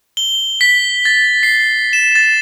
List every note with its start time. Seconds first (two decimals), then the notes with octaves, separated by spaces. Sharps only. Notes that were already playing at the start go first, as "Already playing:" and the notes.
0.17 G7
0.61 B6
1.05 A6
1.43 C7
1.93 E7
2.15 A6